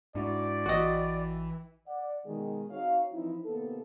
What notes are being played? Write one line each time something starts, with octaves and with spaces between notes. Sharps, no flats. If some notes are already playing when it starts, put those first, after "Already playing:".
G#2 D4 E4 F#4 D5
A1 E3 F#4 D#5 G5
D5 F#5
B2 D#3 G#3 G#4
C4 D#4 F#4 C#5 F5
E3 F3 C4 D#4 E4
C3 D#3 A#3 B3 A4